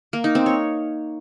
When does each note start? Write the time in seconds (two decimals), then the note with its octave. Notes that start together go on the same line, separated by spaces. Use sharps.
0.13 A#3
0.24 D#4
0.35 C4
0.46 C#5